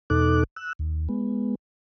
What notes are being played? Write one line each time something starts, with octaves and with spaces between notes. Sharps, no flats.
E2 B2 D#4 A4 D6 F#6
E6 F#6
D#2
G#3 B3